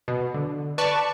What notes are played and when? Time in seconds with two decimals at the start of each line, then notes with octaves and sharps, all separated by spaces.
0.08 B2
0.34 D3
0.78 B4 D5 A5 C#6